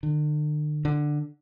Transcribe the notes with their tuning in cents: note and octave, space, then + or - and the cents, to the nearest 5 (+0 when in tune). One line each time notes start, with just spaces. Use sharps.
D3 +40
D3 +10